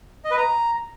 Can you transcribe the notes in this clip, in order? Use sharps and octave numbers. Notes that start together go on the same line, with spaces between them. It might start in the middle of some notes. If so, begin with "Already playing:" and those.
D#5
B4
A#5